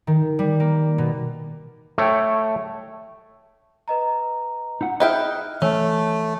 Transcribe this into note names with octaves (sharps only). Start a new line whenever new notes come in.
D#3
G3
A#3
B2
A3 C#5 G5
B4 D#5 A#5
D#4 E4 F#5
D#4 E4 G#4 E5 G5 F6 F#6
E3 A3 C#4 E6